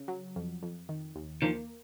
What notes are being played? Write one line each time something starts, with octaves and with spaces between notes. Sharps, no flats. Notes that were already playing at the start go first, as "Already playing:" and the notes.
Already playing: C#3
F#3
F2
F2
D#3
D#2
D#3 F3 A#3